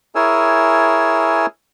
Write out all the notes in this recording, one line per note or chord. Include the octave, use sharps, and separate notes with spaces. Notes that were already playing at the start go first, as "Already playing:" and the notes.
E4 G#4 A#4 C#5 G#5 E6